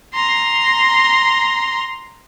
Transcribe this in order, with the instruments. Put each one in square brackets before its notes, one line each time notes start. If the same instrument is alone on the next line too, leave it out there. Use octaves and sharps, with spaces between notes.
[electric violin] A#5 C6